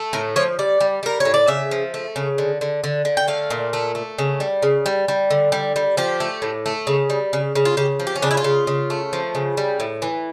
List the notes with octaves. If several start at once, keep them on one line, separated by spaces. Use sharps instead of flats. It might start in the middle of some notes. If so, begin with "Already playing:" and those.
Already playing: A3
A2 A#4
F3 C#5
G3 D5
G3
G3 A#4
A2 C#5
D5
C#3 E5
F3
A3
C#3
D3
D3
D3
D3
G5
A3 F5
A#2
A3
A3
C#3
G3
C#3
G3
G3
D3
G3
G3
F3 G4
A3
A2
A3
C#3
G3
C#3
C#3
F4
C#3 G4
F3
G4
C#4
C#3 D4
E4
F4
C#3
C#3
A3
F3
C#3
G3
A2
E3